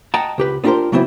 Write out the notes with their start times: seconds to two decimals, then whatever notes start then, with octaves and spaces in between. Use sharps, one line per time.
0.14 D#5 F#5 G5 A5 A#5
0.38 C#2 G4 B4
0.64 B3 D4 F4 G4 A#4 C5
0.92 C#3 E3 F#3 B3 C4 E4